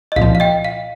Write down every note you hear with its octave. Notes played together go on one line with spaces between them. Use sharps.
D#5
C2 A#2 F3 F5
F5
D#5 G5
F5